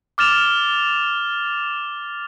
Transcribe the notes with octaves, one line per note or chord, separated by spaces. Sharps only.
D6 F6 A6 E7 F7